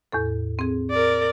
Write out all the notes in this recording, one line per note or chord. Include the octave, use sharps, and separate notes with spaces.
E2 A2 A4
C4 G#4
A#4 D5